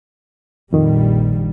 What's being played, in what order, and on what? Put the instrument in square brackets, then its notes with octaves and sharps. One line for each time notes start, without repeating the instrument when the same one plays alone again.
[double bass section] A#1 G3 [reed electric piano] F2 D#3